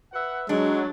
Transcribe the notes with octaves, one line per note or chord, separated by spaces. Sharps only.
B4 E5 F#5
F#3 G#3 D4